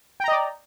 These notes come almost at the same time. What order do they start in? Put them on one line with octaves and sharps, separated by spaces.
G5 A#5 D#5 D5